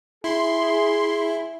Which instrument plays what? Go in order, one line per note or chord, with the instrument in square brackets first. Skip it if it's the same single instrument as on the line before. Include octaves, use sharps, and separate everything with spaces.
[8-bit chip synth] E4 [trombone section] G#4 [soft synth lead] E5 [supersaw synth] C6